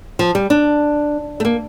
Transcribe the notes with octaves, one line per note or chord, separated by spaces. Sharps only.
F3
G3
D4
A3
A#3